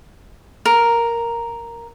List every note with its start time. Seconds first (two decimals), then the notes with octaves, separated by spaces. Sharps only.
0.66 A#4